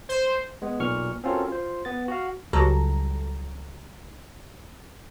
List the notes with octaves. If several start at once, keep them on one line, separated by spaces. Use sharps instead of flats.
C5
G#3 B3
B1 A#2 C#6 F6
C4 C#4 F4 F#4 A4 A#4
F4 C5
B3 A6
F#4 F5
C#2 F#3 G3 A4 A#5